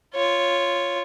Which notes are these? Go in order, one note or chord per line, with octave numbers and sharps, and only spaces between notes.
F4 C#5